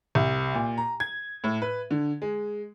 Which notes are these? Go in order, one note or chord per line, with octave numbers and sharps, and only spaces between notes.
C2
A#2
A#5
G#6
A2
B4
D3
G#3